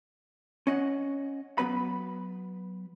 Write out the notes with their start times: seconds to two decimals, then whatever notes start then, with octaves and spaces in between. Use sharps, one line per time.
0.67 C#4 D#5 F#5
1.58 F#3 B3 B4 B5